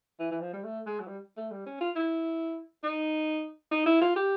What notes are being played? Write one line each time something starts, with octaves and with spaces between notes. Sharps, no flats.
E3
E3
F3
G3
A3
G#3
F#3
G3
A3
G3
C#4
F4
E4
D#4
D#4
E4
F4
G4